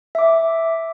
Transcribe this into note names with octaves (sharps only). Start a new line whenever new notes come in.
E5 D6